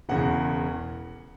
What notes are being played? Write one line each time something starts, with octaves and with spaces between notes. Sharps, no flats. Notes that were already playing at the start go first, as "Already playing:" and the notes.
E1 E2 C#3 F#5